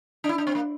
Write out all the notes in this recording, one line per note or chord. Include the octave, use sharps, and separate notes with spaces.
D4
E4
D4
C4
A#3